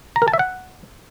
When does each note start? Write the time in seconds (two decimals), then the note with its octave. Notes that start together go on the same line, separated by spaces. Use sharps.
0.16 A#5
0.22 A#4
0.28 A5
0.34 E5
0.39 F#5